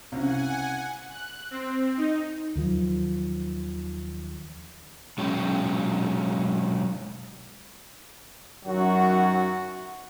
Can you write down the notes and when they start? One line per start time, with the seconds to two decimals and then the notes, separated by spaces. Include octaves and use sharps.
0.12 C2 C#3 F#5 G#5
1.10 F#6
1.51 C4
1.97 D#4
2.55 D#2 D#3 F3 F#3
5.18 B2 F#3 G#3 C#4 G5
8.65 F#2 D#3 F#3 F#4